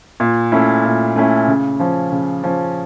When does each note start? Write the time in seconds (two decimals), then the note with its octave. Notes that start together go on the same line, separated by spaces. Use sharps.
0.20 A#2
0.52 A3 C#4 E4
0.85 A#2
1.16 A3 C#4 E4
1.48 C#3
1.79 F3 C#4
2.12 C#3
2.43 F3 C#4